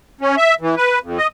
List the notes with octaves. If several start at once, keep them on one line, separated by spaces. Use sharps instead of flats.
C#4
E5
E3
B4
F2
D#5